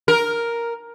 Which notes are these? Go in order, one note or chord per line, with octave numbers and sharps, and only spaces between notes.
A#4